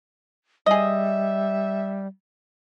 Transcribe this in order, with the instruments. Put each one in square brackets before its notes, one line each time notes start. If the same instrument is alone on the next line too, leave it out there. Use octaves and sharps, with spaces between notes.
[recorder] G3 [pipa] G#4 D#5 [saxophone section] E5